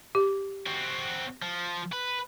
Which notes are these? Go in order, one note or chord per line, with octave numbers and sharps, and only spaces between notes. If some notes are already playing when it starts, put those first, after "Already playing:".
G4
C4 F#4
F3
B4